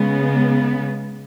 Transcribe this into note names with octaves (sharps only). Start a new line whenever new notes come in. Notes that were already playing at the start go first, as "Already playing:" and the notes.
Already playing: C#3 G#3 B3